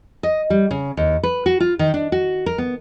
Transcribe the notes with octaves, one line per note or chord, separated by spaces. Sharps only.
D#5
G3
C#3
D#2
B4
F#4
F4
D#3
D4
F#4
A#4
B3